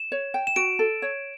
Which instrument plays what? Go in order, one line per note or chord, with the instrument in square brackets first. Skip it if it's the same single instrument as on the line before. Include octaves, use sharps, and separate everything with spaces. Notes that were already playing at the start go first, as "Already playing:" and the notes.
Already playing: [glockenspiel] E7
[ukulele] C#5
G5
[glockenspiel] E7
[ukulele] F#4 [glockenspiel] D7
[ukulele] A4
C#5